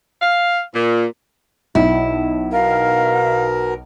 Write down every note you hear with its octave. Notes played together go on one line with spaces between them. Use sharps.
F5
A#2
B1 E4
B2 A#4 F5